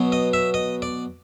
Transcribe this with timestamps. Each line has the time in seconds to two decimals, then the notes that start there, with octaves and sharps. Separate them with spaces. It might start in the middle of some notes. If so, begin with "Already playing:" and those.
Already playing: B2 F#3 B3
0.12 D#5
0.33 E5
0.54 D#5
0.82 D5